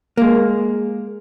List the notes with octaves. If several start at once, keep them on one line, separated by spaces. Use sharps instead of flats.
G#3 A#3